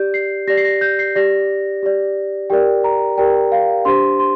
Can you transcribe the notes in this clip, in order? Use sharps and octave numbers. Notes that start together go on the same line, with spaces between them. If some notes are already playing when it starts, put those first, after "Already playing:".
Already playing: G4 D5 G6
C7
G4 D5 A#6
C7
A#6
G6
C7
G4 D5 A#6
G4 D5
G4 A#4 D5 G5
A#5
G4 A#4 D5 G5
F5
D4 G4 C5 C6
C6